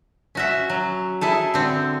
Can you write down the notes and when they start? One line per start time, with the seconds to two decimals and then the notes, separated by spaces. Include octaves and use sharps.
0.35 C#4 F#4 E5
0.70 F#3
1.21 E4 G#4 A4
1.54 D3 C4